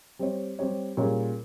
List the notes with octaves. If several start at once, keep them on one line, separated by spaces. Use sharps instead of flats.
G3 C4 G4 C#5
G3 C4 G4 C#5
A#2 G3 C#4 G#4 C#5